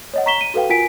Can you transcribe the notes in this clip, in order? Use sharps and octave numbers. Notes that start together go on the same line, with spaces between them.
C#5 D#5 F#5
A#5 C#6 B6 E7 G7
D#7
F#4 A4 B4 F5 G5
F4 A#4 F#5 G#5 B6 D7